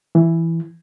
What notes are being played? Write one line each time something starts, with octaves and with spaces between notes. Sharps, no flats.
E3